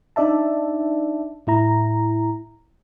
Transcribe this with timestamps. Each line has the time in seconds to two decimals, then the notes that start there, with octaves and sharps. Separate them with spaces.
0.16 D4 D#4 D5 E5 A5
1.47 A2 E4 A#5